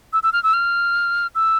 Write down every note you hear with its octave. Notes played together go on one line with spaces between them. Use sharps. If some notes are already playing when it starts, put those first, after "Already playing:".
E6
E6
F6
E6
F6
E6